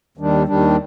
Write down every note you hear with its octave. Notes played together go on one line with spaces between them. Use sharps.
D#2 D#3 G3 D4
D#2 D#3 G3 D4